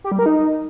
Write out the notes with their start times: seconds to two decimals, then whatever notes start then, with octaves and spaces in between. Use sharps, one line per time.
0.04 G4
0.12 G3
0.19 A#4
0.26 D#4